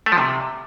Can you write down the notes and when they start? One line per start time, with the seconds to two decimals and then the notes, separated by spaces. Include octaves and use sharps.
0.06 A3
0.12 F3
0.18 C3